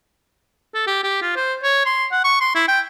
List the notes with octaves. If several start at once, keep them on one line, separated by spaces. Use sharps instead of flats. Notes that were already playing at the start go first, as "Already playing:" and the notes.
A4
G4
G4
F4
C5
C#5
C6
F#5
C#6
C6
E4
G5